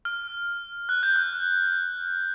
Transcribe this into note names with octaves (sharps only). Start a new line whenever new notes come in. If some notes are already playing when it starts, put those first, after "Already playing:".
F6
F#6
G6
F#6